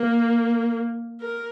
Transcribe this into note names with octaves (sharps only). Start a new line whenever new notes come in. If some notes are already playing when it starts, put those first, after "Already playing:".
Already playing: A#3
A#4